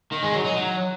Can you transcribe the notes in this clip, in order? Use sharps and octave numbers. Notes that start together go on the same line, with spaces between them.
D#3
G#3
F#3
D#4
F#3